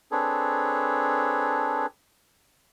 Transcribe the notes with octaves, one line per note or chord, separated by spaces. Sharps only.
C4 D4 G#4 A4 B4 C#5